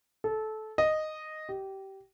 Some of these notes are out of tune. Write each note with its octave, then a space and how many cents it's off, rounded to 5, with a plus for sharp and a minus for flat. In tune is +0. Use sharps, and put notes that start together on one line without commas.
A4 -20
D#5 -5
G4 -20